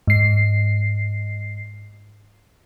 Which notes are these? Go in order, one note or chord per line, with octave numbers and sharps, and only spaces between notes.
G#2 C7